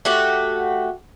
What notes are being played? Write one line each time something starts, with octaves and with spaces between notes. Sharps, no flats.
A3 F#4 G4